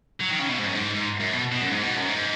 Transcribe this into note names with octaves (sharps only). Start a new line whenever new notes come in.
F#3
D#3
C#3
B2
G#2
F#2
G#2
G#2
F#2
B2
B2
F#2
G#2
B2
F#2
G#2